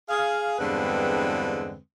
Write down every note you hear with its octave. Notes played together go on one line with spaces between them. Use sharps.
G#4 F5
E2 G2 D3 G#3 C4 B4